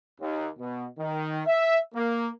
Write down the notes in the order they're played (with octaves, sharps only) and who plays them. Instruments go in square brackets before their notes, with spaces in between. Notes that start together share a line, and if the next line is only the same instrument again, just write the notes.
[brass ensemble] D#2
B2
D#3
E5
A#3